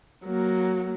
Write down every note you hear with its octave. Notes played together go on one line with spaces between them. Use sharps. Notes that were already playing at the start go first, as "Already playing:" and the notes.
F#3 A#3